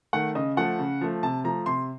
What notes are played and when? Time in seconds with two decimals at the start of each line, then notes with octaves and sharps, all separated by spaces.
0.13 D#3 A3 F#5
0.35 C#3 D#5
0.57 F3 A3 F#5
0.79 C#3
1.01 F3 A3
1.23 C3 A5
1.44 F3 A3 A#5
1.66 C3 C6